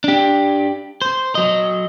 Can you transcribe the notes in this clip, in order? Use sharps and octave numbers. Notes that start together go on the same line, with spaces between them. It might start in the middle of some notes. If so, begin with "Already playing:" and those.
D4 G4
C5
F#3 D#5